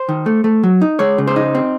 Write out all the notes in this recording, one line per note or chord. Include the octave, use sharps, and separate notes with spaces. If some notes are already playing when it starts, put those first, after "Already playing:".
Already playing: C5
D#3
A3
A3
F#3
D#4
G#3 C#5
C#3
C5
D#4
C4